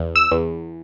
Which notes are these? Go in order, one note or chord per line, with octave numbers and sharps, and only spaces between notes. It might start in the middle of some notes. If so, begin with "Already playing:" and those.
Already playing: E2
E6
E2